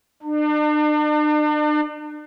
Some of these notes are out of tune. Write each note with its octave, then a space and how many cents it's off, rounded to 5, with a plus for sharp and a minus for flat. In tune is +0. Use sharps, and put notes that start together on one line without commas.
D4 +40